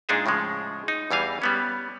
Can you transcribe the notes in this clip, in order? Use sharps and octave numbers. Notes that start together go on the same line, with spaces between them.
A#2 G#3 D4 D#4 G#4 E5
A2 C#3 F3 G#3
D#4
E2 E3 G3 F5 G#5
G3 B3 C#4